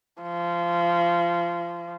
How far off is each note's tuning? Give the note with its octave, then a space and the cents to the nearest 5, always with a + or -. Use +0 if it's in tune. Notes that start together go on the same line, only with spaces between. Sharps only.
F3 -20